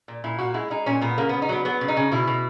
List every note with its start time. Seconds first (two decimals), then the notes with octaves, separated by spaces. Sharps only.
0.08 A#2
0.24 A#2 E4
0.38 A#2 F#4
0.54 G#3 E4
0.70 G#3 D#4
0.86 A#2 C#4
1.01 A#2 B3
1.18 C#3 A#3
1.29 C#3 B3
1.42 D#4
1.49 F#3 B3
1.65 F#3 B3
1.81 C#3
1.88 D#4
1.97 C#3
2.11 B2 E4
2.27 B2